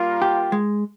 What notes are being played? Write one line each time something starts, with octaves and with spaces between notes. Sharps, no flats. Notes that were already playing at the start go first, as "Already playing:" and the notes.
Already playing: G3 A#3 F4 A#4
G4
G#3